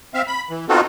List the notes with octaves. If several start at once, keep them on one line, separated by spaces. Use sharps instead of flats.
C4 E5 F5
B5
E3
B3 C4 D#4 F4 F#4 A4